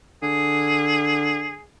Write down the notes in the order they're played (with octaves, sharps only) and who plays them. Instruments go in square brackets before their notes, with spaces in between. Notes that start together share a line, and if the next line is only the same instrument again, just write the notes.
[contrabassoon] D3 [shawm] G#4